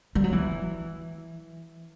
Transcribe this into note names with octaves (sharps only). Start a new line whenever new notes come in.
G3
F#3
E3